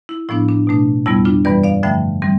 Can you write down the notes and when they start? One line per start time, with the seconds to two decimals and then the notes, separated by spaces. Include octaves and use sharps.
0.09 E4
0.29 A2 F3 B3 D4 E4
0.48 D4
0.67 B2 A3 D4
1.06 F2 C3 G3 B3 E4
1.25 D4 F4
1.45 G2 E3 G3 B4 D5
1.64 D5 F5
1.83 G2 D3 F3 A3 E5 G5
2.22 E3 G3 C4